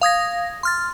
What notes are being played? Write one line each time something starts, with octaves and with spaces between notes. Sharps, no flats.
F5 D#6 G#6 A#6
C6 F6 A6